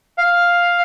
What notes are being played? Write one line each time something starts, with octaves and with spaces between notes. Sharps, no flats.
F5